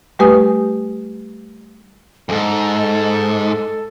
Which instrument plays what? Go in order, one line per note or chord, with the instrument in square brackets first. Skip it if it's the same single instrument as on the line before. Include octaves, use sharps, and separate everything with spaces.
[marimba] G3 A3 G4 B4 G#5 D#6
[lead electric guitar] F2 G#2 [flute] A4